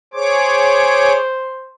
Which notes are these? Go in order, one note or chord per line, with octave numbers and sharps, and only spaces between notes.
G#4 C5 C#5 D6